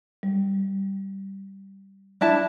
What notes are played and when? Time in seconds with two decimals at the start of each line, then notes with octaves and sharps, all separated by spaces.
0.23 G3
2.21 D4 E4 A5